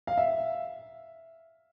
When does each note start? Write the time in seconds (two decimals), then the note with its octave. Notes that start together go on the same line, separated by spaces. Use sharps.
0.07 F5
0.18 E5